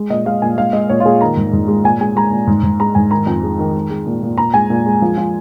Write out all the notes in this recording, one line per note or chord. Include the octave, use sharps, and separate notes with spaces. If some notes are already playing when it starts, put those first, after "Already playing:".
Already playing: G#3
A#2 D#5
G#3 F5
A#2 G#5
G#3 F5
G#3 D#5
A#2 C#5
F4
A#2 G#4
D#3 A#5
G#2
G#2
G#3
A#2 G#5
G#3 G#5
G#3 A#5
A#2
G#2
G#2
G#3 A#5
G#2 G#5
D#3 A#5
F2
G#3
D#3
G#3
G#3
A#2
A#2
A#2 A#5
G#3 G#5
A#2
G#3
F3
F3